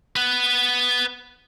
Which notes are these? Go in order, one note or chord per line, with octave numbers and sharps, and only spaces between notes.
B4 F#5